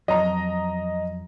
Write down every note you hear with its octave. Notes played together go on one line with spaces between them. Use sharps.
F2 F#3 D#5 A#5